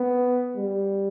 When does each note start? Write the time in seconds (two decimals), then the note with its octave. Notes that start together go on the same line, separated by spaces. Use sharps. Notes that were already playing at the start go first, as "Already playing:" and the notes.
Already playing: B3
0.57 G3